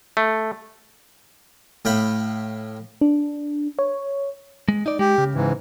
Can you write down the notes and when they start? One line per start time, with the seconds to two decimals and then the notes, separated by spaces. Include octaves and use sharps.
0.17 A3
1.85 A2 F5 G5 B5
3.01 D4
3.79 C#5
4.69 G#3
4.86 D#4 D5
4.99 G#3 G4
5.18 C#3
5.35 G#2 E3